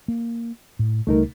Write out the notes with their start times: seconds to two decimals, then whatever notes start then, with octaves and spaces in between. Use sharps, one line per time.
0.08 A#3
0.79 A2
1.07 C#2 G3 A3 D#4 A#4